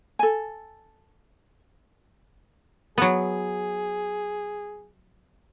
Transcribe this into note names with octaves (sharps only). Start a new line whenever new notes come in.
A4 G#5
F#3 B3 G#4